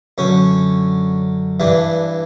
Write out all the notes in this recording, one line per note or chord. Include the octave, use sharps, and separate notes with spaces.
F#2 D3 C#4
G2 E3 D4